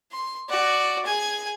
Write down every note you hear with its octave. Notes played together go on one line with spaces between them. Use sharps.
C6
F#4 D5
G#4 G#5